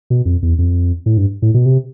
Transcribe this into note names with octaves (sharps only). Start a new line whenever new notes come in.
B2
F2
E2
F2
A2
G2
A2
B2
C3